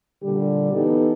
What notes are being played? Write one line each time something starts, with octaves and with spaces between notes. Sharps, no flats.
A#2 D3 G3 G4
E3 B3 D#4 G4 A4